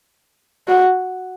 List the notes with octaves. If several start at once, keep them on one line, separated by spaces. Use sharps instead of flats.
F#4